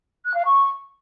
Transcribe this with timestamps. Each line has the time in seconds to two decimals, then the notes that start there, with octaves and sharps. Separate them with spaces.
0.25 F#6
0.35 F5
0.44 C#6